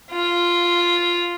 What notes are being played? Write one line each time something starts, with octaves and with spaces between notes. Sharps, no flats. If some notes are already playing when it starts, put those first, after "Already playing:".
F4